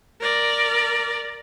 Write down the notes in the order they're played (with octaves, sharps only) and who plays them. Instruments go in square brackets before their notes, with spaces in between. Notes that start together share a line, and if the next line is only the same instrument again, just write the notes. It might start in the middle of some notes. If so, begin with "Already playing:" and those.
[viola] A#4 D5